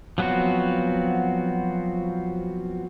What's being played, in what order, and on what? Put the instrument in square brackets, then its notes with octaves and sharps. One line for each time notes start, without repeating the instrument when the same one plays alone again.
[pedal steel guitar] F3 F#3 B3 C4 F#4